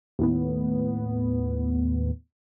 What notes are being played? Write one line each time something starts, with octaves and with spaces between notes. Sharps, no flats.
D#2 A2 B3